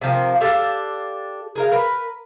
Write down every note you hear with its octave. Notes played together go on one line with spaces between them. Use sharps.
C3 F3 A#3
D4 G4 A4 F5
G#4 A#4 F5
A#4 B4